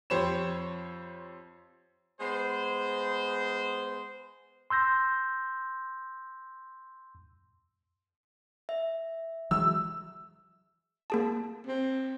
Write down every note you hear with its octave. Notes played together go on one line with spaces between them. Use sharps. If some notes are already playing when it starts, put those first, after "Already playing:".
F2 G4 C5 C#5 B5 E7
G#3 B3 C5
C6 E6 G6 A#6
E5
E3 F#3 G#3 E6
A#3 G#4 A5
C4